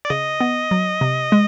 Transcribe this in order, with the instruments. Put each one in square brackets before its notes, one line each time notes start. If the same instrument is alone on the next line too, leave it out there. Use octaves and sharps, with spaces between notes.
[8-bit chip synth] D5
[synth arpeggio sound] C#3 [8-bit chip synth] D#5
[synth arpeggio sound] B3
F#3
C3
G#3